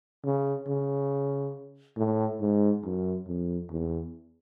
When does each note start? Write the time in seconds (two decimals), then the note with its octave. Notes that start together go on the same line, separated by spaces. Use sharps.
0.25 C#3
0.68 C#3
1.97 A2
2.41 G#2
2.84 F#2
3.27 F2
3.71 E2